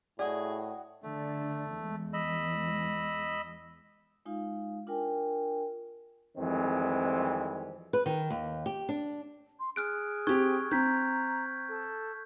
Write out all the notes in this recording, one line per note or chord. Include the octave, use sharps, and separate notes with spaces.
A2 F#4 G#4 D5 D#5 G5
D3 A3 D4
E2 G#3
D#5 B5 E6
G#3 D#4 F4 F5
D4 F4 A#4 G5 G#5
F2 D#3 E3 G3 G#3 C4
B4
D#3
D#2
G4
D4
C6
G#4 F6 F#6 D7
C4 G4 C#6 F#6 G#6
C4 A#5 G6 G#6 B6
A4